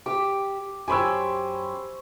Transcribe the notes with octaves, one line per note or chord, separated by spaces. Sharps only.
G4 E5 D6
F#2 G4 C5 C#5 G#5 B5 E6